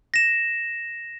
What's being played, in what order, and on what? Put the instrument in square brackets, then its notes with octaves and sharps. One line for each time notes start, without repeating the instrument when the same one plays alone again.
[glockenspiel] A#6 E7